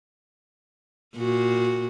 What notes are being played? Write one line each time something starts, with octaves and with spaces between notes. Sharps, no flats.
A#2 F#4